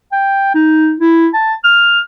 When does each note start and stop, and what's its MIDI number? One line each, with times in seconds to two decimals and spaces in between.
0.12 0.52 79
0.55 0.95 63
1.00 1.28 64
1.34 1.54 81
1.64 2.00 89